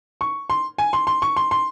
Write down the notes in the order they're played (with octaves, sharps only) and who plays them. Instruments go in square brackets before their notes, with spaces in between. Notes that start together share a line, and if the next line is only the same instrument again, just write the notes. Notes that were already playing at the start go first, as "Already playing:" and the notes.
[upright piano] C#6
C6
G#5
C6
C6
C#6
C6
C6